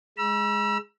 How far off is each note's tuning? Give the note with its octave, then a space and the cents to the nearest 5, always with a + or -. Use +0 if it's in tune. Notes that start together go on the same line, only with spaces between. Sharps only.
G#3 +0 B5 -45 E6 +25